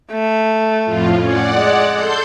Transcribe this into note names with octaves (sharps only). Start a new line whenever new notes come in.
A3
F2 A2 F4
C#4 D5 F#5
G#3
A4 C6 G6